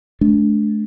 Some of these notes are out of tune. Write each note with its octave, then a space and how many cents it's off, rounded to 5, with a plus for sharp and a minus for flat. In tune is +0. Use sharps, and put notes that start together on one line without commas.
A3 -45 D4 -20